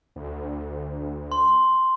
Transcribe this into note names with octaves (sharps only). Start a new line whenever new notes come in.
D2
C6